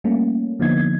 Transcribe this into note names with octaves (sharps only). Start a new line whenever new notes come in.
G3 A3 A#3 C#4
D3 F3 A#3 B3 D#4 G#6